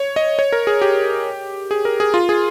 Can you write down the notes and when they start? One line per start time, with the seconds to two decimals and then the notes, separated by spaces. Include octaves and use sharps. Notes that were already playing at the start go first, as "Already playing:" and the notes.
Already playing: C#5
0.16 D#5
0.39 C#5
0.52 A#4
0.67 G#4
0.81 G4
1.71 G#4
1.85 A#4
2.00 G#4
2.14 F4
2.29 G#4